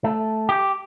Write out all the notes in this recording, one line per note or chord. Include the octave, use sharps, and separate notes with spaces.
A3
G4